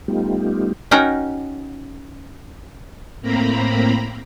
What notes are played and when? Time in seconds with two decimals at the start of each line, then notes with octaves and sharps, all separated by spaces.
0.08 G3 A3 B3 D#4 F4 G4
0.91 C#4 D#4 F#4 A#4 G5 A#5
3.21 A2 A#3 C4 A#5 B5